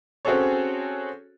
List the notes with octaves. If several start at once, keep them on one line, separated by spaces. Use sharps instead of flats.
C4 C#4 F#4 G#4 A4 C#5